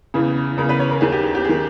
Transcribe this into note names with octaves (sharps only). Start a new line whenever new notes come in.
E2 C#3 E3
E2 C#3 E3 A#4
B4
C#5
A#4
D#2 D#3 G#4
G4
G#4
G4
D#3 G#4